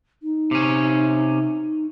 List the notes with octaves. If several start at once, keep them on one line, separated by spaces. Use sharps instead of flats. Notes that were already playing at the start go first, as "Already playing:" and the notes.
D#4
C3 C#4